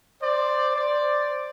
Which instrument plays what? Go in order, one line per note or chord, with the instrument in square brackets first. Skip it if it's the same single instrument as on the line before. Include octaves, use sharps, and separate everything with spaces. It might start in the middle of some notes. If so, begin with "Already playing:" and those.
[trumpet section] C5 D5
C5 D5